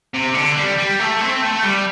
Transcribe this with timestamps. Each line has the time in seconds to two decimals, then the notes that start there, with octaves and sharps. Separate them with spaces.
0.14 C3
0.35 D3
0.57 G3
0.78 G3
1.00 A3
1.21 C4
1.42 A3
1.63 G3